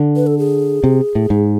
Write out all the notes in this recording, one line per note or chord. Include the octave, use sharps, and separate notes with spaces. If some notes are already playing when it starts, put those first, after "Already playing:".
Already playing: D3
B4
A4
G#4
C3
A2
G#2